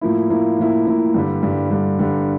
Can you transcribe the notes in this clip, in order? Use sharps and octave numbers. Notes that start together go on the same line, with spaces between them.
A2 F3 A#3 E4
A2 F3 A#3 E4
A2 F3 A#3 E4
A2 F3 A#3 E4
G2 D3 G3
G2 D3 G3
G2 D3 G3
G2 D3 G3